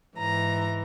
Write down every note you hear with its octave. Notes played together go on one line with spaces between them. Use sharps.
G#2 E3 A#5